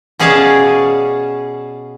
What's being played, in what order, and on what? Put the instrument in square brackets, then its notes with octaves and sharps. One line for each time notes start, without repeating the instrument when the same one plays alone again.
[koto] B2 C#4 G#4 D5 F5 A5